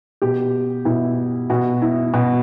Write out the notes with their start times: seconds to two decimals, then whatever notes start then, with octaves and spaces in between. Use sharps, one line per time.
0.22 B2 G4
0.85 B2 E4
1.50 B2 F#4
1.82 E4
2.14 B2 F#4